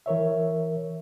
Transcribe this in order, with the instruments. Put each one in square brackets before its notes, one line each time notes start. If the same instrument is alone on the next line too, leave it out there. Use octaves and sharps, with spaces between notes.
[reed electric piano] E3 A#4 C#5 E5